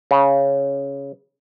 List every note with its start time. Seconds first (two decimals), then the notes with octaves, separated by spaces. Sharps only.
0.11 C#3